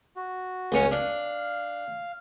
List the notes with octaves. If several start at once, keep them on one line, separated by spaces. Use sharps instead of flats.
F#4
C#2 C#4
D4 F5